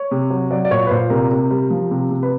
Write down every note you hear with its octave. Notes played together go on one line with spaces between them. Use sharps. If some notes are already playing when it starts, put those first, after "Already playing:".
Already playing: C#5
C3
F#3
F#3 D5
D5
A#2 C#5
B4
A#2 C5
C3 A#4
C3
G3
F3
C3
C3
B4